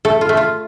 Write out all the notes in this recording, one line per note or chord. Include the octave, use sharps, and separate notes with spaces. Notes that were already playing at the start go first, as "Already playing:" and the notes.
A3 A4
F4
A3
F4